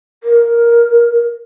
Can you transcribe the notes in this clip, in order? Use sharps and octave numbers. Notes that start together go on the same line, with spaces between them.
A#4